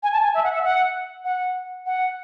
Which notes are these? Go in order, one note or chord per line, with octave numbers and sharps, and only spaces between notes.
G#5
A5
G#5
E5
F#5
E5
F#5
F#5
F#5